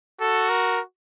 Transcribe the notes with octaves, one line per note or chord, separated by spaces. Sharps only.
F#4 A4
A#4